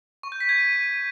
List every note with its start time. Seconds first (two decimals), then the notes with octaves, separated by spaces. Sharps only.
0.23 C#6
0.32 G6
0.40 B6
0.49 G#6
0.58 D#7